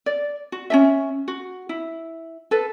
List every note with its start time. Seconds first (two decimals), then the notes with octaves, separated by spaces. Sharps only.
0.06 D5
0.52 F#4
0.70 C#4 D4 E5
1.28 F#4
1.69 E4
2.51 A4 B4